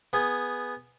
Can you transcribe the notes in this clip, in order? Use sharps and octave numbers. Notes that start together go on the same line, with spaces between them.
B3 G#4